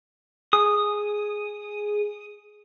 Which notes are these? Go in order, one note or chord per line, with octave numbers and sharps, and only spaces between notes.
G#4 D#6